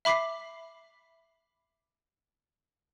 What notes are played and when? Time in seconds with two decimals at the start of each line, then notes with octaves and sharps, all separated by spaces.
0.05 E5 B5 D6 B6 C7